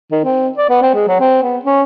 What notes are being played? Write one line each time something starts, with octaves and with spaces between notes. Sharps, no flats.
D#3
C4
D5
B3
C4
G#3
F#3
C4
B3
C#4